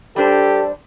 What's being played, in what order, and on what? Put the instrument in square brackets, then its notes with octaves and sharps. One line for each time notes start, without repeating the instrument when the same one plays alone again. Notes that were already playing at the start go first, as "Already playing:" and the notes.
[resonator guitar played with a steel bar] G3 D4 C5 [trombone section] G4 A4